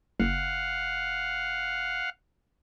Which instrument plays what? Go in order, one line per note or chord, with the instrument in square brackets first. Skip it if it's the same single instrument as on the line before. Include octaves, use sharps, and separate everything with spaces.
[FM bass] F#1 [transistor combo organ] F5 F#5